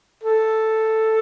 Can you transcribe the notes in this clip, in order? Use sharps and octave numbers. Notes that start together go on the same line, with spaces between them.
A4